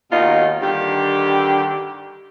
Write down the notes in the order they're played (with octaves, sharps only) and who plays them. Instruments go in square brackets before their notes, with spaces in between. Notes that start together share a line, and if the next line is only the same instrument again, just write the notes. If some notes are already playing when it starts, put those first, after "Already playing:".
[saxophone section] D#2 B2 D#3 D#4 F4 D#5
G2 D3 D#3 G4